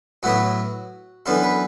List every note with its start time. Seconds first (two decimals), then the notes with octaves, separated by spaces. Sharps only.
0.23 A2 F#3 B3 E4 F#4
1.26 F#2 E3 B3 D4 A4
1.43 B4